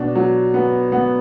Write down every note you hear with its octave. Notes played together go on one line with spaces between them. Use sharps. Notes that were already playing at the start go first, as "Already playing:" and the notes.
Already playing: B2 D4
F#3
B3
B3